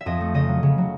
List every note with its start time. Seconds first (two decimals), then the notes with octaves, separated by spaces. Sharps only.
0.01 E5
0.06 F2 D#5
0.21 A3
0.34 C#3 D#5
0.48 F#3
0.63 C#3
0.78 F#3